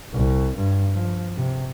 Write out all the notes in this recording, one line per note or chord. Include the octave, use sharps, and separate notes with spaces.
C2
G2
F3
C3